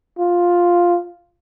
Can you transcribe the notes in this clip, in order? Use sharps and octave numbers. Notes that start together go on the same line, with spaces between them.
F4